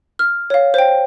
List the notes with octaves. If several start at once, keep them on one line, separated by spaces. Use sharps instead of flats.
F6
C#5 F5
C5 G5